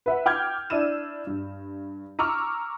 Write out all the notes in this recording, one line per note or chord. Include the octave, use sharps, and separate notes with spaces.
B4 E5 F#5
G5 D6 F6 G6 G#6
D4 E4 E6 D#7 E7
G2
A#5 C#6 D6 E6 F6